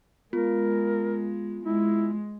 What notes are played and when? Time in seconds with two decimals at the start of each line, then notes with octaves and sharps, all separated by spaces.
0.33 G#3 B3 F4 A#4
1.65 G#3 E4